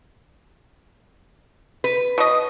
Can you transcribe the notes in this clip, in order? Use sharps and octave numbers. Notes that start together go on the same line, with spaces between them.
B4
B2 D#5